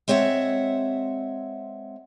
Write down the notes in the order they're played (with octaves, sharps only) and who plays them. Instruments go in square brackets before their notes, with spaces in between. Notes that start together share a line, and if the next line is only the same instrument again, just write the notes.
[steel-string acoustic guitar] G#3 C4 C#5 E5 F#5